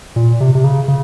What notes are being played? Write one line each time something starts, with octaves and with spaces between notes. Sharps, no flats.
A#2
C3
C3
C#3
C#3